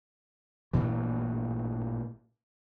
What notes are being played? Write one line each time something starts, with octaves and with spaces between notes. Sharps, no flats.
A1 G2 A#2 E3